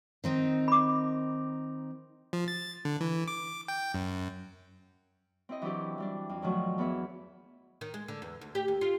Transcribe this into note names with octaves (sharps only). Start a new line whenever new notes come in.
D#3 C4 D#4
B5 D6
F3
A6
D3
E3
D6
G5
F#2
C4 E4 D#5
E3 F#3 D4 E4 G4
E3 G3 D4
F2
G2 D#3 F3 F#3 A3
E2 B3 G#4 E5
D#3
G#3
D3
E2
D2
G4
D#2
F4